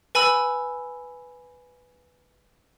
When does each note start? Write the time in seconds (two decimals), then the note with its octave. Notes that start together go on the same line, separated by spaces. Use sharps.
0.15 B4 G#5 B5 E6